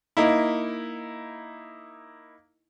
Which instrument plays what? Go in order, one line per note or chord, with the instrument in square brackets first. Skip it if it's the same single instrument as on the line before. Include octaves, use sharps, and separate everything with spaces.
[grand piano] A#3 D#4 E4